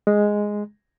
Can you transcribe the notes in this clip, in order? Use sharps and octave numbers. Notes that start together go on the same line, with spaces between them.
G#3